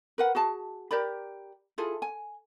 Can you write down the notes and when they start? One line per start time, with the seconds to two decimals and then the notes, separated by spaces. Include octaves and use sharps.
0.18 A#4 B4 F#5
0.35 F#4 G#4 A5
0.91 G4 A#4 D5 B5
1.78 E4 F4 G#4 A4
2.02 G#5